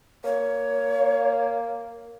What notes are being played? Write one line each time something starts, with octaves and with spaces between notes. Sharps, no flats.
A#3 C#5